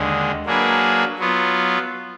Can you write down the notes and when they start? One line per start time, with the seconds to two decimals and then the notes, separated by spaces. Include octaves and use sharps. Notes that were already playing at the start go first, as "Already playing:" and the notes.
Already playing: D#2 D3 G#3
0.46 F#3 A#3 D4 G#4 B4
1.19 F#3 B3 F4